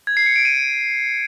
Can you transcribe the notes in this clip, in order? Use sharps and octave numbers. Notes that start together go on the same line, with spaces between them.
G#6
C7
C#7
D7
D#7